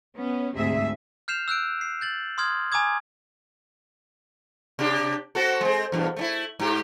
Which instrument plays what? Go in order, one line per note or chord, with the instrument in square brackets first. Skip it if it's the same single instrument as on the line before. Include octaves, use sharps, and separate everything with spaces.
[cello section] B3 C#4
D2 G#2 C3 G#4 E5
[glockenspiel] F6 G6 C7 E7 F7
E6 F#6 G6 D7
C7
G6 A6 F#7
C6 D#6 F6 G#6
G#5 A#5 D6 D#6 G#6
[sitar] C3 D4 G4
C4 F#4 A4
G#3 C4
E2 G2 B2
A3 C#4 E4
G#2 G4